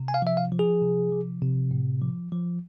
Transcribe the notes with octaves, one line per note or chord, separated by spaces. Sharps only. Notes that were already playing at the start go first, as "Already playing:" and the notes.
Already playing: C3
G#5
F5
F3 E5
F5
F3
G#4
C3
F3
C3
A2
F3
F3